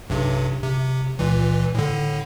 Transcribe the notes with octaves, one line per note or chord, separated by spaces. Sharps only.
B1 G2 C3
C3
C#2 A#2 E3
A2 D3